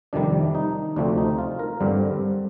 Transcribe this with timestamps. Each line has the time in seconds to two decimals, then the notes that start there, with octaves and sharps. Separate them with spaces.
0.13 F2 C3 D#3 G3 D4
0.55 D#4
0.96 D2 C3 F3 A3 C4 D4
1.18 D#4
1.39 F4
1.59 A#4
1.80 G2 D3 G3 C4